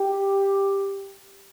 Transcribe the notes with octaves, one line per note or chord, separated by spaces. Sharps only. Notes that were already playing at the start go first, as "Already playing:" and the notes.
Already playing: G4